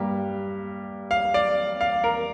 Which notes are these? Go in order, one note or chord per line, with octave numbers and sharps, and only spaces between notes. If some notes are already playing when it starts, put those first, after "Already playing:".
Already playing: G2 G3 A#3 G4
F5
D5
F5
A#4